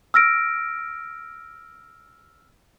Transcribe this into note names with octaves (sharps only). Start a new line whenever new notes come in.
E6 F6 A#6 D7